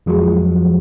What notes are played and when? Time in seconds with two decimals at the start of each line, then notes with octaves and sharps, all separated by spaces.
0.06 F2 F3 F#3 G#3